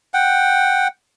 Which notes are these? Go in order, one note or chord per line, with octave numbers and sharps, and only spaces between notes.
F#5 G5